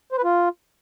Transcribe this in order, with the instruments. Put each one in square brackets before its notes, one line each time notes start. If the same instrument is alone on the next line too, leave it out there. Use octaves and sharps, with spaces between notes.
[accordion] C5
B4
F4